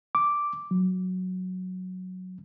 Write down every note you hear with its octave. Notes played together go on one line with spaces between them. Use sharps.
D6
F#3